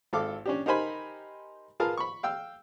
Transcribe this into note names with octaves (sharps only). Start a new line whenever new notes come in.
G#1 A4 F5 D6
C#4 D4 G4
D#4 G4 A#4 C5 G#5 B5
F4 G#4 A#4 B4 F5 A5
B5 C#6
F5 G5 E6